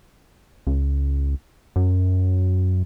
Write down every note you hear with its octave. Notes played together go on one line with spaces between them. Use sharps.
C#2
F#2